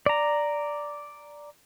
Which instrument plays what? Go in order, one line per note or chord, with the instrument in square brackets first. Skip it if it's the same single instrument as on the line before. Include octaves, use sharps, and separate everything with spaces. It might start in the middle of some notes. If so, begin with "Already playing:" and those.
[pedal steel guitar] D5 A#5